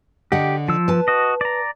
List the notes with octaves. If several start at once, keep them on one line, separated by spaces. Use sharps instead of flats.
D3 G4 D#5 F#5
F3 E6
B4 A5
F#4 D#5
D5 A#5